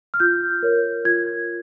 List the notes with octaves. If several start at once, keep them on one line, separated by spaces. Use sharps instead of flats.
F6
F4 G6
A#4 C#5
F4 G#6